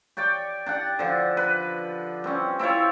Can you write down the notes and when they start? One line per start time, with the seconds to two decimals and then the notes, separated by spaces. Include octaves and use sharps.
0.17 G4 C#5 D5 G5
0.66 D4 G4 F#5
0.99 D3 F3
1.37 B4
2.24 G3 C4 C#4
2.59 C4 E4 F4 C#5